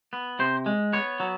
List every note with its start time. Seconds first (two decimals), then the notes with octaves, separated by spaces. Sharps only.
0.13 B3
0.39 C3 C5
0.66 G#3
0.93 B3 C#5
1.20 F#3